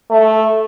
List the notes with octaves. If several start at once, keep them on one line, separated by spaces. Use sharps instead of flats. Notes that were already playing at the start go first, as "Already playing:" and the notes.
A3